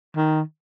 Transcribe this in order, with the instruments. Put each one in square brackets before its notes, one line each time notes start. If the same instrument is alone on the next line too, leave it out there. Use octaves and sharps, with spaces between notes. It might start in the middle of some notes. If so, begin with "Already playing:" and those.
[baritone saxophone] D#3